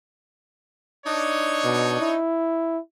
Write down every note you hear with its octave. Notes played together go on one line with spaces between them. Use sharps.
D4 D#4 C#5
B2
E4